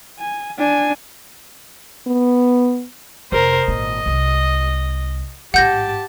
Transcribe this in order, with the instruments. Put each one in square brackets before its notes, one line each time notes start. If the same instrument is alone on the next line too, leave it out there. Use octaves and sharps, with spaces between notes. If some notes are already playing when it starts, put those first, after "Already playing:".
[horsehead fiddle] G#5
D4 G#5
[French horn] B3
[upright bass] F1 [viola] A#4 C5
[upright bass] G#1 A#2 [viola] D#5
[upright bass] C2 C4
[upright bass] A1 G#2 [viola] G4 A5 [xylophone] F#5 G6 A#6